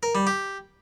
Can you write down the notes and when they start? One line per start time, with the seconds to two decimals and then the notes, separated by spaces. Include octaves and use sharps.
0.03 A#4
0.15 G3
0.27 G4